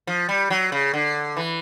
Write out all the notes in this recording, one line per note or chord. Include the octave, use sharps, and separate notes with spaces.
F3
G3
F#3
C#3
D3
E3